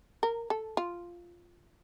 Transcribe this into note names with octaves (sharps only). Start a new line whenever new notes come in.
A#4
A4
F4